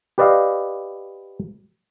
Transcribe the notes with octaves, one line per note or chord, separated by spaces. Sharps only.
G4 B4 D5 D#5 F5